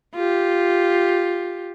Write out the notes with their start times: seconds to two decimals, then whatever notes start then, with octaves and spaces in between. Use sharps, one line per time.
0.15 F4 G4